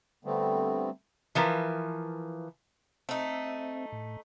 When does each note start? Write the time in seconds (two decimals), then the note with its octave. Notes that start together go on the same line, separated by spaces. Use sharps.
0.25 D3 G3 A3 B3 C4
1.35 E3 F3 A#4 B4
3.09 A3 C4 D#4 E5
3.92 A2